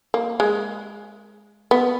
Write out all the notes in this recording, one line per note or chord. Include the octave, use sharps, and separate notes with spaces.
A#3
G#3
B3